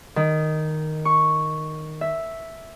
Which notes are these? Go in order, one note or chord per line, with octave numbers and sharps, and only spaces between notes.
D#3
C#6
E5